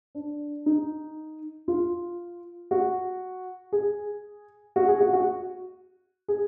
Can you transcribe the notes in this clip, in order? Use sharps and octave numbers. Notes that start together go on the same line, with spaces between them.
D4
D#4
F4
F#4
G#4
F#4
G#4
F#4
F#4
G#4